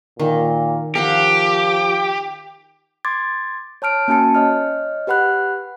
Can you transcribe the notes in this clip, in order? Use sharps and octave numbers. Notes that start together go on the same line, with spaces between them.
A#2 D#3
F3 G4 A#4 F5 F#5
C6 D6 G#6 A6
C#5 A5 F6 D7
A#3 C#4 F#4 G#5 A5 C#7
C#5 D#5 F6
G4 B4 F#5 B5 F#6